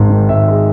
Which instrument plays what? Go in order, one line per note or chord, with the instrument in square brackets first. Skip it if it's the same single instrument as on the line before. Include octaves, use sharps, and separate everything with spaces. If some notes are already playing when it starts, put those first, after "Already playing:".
Already playing: [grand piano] G#1 G#2
D#3
G#1 E5
G#3